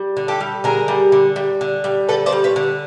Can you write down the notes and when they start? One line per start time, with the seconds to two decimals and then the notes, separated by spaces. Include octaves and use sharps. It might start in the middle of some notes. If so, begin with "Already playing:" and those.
Already playing: G3
0.17 D3
0.28 G4 A4
0.41 G3
0.64 D3 G#4 A#4
0.88 G3
1.12 D3
1.36 G3
1.61 D3
1.84 G3
2.09 D3 A4 B4
2.26 C5 D5
2.32 G3
2.44 B4 C#5
2.56 D3